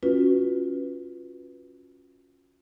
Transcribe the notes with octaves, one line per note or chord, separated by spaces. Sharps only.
C#4 F4 F#4 B4